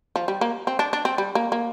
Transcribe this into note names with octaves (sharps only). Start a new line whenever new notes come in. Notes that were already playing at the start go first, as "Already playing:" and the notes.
F3
G3
A#3
C4
D4
D4
C4
G3
A#3
A#3